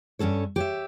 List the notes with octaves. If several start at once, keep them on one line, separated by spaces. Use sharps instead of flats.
G2 A#2 C#4 A4 C#5
G4 C#5 E5